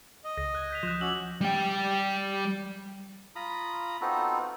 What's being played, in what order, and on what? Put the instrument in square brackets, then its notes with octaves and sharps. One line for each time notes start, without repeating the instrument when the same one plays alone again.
[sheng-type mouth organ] D#5
[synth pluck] C#2 [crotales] A#6
[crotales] F#6 G#6
G6 B6 F7
[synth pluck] F3 [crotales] F#6 G6 E7
[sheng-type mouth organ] C#4 F#4 [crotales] D6 E6 F#7
[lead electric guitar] G3 G5
[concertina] F4 A#5 B5 D#6
B3 C4 D#4 F4 F#4 A4